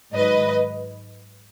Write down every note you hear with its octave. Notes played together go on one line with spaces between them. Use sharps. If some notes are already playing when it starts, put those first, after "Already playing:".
G#2 D#3 F#3 B4 D#5